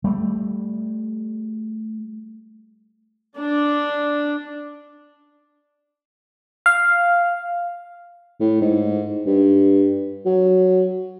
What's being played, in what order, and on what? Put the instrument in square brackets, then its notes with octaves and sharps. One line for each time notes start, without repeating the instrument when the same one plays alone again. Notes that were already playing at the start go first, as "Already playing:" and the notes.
[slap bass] G3 A3
[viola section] D4
[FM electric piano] F5
[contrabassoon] A2
G#2
G2
F#3